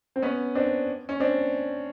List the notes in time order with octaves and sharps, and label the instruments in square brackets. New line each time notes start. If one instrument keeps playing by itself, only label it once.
[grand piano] C4
B3 C#4
C4 D4
C#4
C4 D4